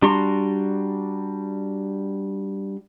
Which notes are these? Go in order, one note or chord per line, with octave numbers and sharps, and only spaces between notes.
G3 D4 F#4 A#5 C6